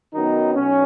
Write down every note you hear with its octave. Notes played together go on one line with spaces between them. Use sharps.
F#2 D#3 F#3 B3 D#4
B1 B2 C#4